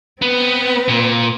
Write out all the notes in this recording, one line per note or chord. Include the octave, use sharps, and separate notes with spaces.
B3 C4 B4
A#2